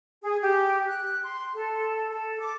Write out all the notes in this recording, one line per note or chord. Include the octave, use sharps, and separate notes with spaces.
G#4
G4
F#6
C6
A4
A4
D6